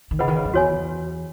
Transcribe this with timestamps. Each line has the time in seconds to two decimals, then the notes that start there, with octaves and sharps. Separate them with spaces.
0.11 D#3
0.19 C#3 G#4 B4 D#5 F#5 B5
0.28 D#3
0.36 C#3
0.45 F#2
0.54 E2 F#4 A4 C#5 G#5